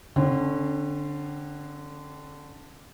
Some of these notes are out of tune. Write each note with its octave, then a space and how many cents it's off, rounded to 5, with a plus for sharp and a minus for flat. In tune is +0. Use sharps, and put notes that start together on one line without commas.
D3 +0 C#4 -40 G5 -10